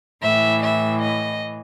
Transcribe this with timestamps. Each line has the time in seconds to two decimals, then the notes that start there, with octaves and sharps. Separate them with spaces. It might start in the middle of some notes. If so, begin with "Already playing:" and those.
0.23 A2 E3 E5
0.63 E5
1.02 D#5